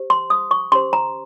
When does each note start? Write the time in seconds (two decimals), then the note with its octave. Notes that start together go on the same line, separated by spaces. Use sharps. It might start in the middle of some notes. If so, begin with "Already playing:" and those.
Already playing: G4 C5
0.10 C6
0.30 D#6
0.51 C#6
0.72 C#4 G4 C5 C6
0.93 A#5